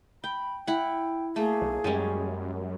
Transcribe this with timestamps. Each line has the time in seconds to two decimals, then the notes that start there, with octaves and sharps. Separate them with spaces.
0.24 G5 B5
0.67 E4 F#5 G5
1.36 A3 A#3 G#4
1.61 B1
1.84 F#2 G3 G#3 C#4